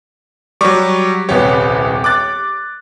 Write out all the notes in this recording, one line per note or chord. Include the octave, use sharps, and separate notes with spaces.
F#3 G3 C#6 D6
D#1 C2 B3 G4 C#5
D6 F#6 A6